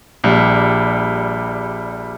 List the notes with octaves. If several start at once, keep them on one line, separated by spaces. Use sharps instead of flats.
A#1 G3